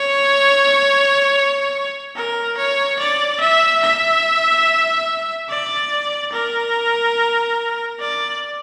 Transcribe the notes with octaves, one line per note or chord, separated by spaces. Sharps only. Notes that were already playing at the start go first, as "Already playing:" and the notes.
Already playing: C#5
A#4
C#5
D5
E5
E5
D5
A#4
D5